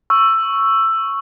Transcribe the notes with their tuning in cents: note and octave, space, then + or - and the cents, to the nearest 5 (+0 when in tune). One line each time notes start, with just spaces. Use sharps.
C#6 +0 E6 +10